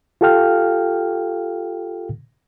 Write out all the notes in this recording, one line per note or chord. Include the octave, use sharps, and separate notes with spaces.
F4 G4 A4 F5 G5 F6